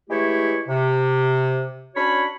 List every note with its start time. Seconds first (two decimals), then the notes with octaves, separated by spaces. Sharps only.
0.10 E3 G#3 A3 E4 G4 C#5
0.68 C3
1.96 C#4 D4 F#4 C#5 B5